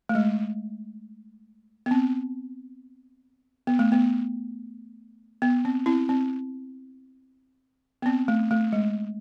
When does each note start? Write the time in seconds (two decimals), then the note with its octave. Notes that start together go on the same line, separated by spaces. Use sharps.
0.09 A3
0.15 G#3
1.86 B3
1.91 C4
3.67 B3
3.79 A3
3.92 B3
5.42 B3
5.65 C4
5.86 C4 E4
6.09 C4
8.02 B3
8.06 C4
8.28 A3
8.51 A3
8.73 G#3